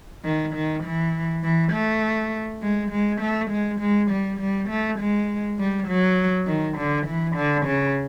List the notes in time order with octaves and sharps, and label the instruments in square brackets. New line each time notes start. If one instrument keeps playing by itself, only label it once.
[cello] D#3
D#3
E3
E3
A3
G#3
G#3
A3
G#3
G#3
G3
G3
A3
G#3
G3
F#3
D#3
D3
E3
D3
C#3